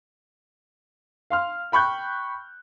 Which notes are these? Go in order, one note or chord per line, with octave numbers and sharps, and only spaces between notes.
F5 C6 F6
G5 B5 C#6 F#6 G6